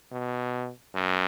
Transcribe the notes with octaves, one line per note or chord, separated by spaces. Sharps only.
B2
F#2